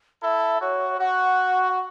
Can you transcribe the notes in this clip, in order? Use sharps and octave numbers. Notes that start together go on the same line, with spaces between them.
E4 A4 E5
F#4 C#5
F#4 F#5